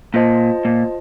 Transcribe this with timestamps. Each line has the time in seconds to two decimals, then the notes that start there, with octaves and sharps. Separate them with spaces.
0.14 A#2 F4 C5 D#5 A5
0.65 A#2